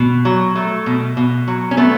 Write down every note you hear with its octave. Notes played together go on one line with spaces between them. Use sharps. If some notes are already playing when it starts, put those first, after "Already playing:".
Already playing: B2
F#3
A3
B2
B2
F#3
C#4
A3 B3